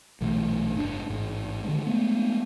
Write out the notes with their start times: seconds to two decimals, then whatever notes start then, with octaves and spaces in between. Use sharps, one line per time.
0.21 B1 A#2 E3 A3
0.74 F#1 G#2 C3 D4
1.10 A1 G#2
1.64 D3 D#3 G#3
1.87 G#3 A3 B3